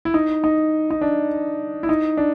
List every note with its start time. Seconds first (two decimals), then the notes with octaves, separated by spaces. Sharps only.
0.05 E4
0.14 D#4
0.44 D#4
0.91 D#4
1.01 D4
1.83 E4
1.89 D#4
2.17 D4